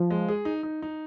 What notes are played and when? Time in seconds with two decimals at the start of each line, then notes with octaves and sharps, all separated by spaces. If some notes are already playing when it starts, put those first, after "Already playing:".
Already playing: F3
0.10 G#3
0.28 G#4
0.45 D#4
0.63 D#4
0.82 D#4